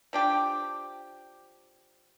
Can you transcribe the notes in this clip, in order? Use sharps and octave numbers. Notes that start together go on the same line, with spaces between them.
F3 D4 G4